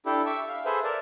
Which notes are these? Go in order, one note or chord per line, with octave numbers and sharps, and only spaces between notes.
D4 E4 G4 A4
E5 C#6 D6 E6
F5
G#4 A4 B4 C5 E5
A#4 D5 A5